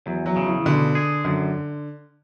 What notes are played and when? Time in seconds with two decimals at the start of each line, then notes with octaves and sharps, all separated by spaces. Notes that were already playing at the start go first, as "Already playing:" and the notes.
0.06 E2 F#3
0.26 F#3
0.36 C#3
0.46 E3
0.65 B2 D3
0.95 G#4
1.25 F#2 D3